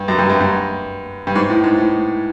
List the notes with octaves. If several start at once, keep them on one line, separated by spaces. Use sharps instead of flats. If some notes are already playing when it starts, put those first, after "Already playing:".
Already playing: G2
F#2
G2
F#2
G2
G2
G#2
A2
G#2
A2